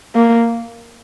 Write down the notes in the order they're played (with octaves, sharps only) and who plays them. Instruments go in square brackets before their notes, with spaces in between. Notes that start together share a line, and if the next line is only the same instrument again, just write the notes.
[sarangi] A#3